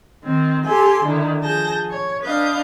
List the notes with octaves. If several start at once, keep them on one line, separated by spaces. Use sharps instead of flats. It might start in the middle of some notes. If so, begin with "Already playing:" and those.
D#3 C4
G4 A4 G#5 C6
D3 D#3 E4
F3 G#4 A5 G6 A#6
C#5
D4 B4 D#5 F5 G6